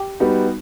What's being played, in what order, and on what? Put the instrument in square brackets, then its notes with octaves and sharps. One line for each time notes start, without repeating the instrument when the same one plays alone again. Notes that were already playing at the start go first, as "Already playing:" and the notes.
Already playing: [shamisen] G4
[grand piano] G3 B3 D#4 F#4